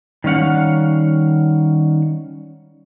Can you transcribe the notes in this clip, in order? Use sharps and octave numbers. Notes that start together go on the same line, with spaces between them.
D#3 G3 C#4 F5 F#5